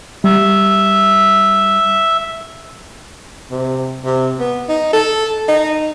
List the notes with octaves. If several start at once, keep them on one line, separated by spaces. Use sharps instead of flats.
G3 E5
C3
C3
B3
D#4
A4
D#4